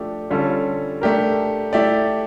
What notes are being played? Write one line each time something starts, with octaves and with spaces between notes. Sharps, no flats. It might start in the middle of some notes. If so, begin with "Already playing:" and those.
Already playing: F3 A3 D4 G4
D3 G3 C#4 F4 A4
A3 D4 G4 A#4
A3 E4 G4 D5